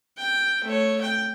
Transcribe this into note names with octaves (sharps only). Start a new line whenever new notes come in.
G5
A3 C#5
G5